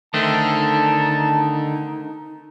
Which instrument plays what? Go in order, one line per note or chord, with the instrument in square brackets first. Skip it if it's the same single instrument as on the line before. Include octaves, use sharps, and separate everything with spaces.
[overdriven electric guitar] D3 [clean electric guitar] D#3 A3 C4 [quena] D#4 [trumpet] A5